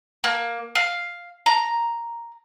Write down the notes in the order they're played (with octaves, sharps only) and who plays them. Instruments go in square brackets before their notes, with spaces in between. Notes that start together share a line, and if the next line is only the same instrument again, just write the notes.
[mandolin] A#3
F5
A#5